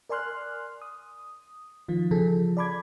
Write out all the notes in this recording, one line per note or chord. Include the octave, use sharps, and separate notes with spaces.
A#4 D5 G#5 C6 F6 F#6
D#6
D#3 F3 F4
C#3 E3 F3 G#4 A4
D5 A5 B5 D6 G#6